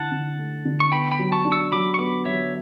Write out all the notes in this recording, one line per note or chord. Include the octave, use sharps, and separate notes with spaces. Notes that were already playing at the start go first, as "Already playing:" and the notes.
Already playing: D3 E4 F#5 A5
D3
A3
D3
C#6
B3 G5 B5
G5 B5
F#3
A5 C#6
D4
C#6 E6
F#3 B5 D6
C#6
B3 B5 D6
F#3 C#5 E5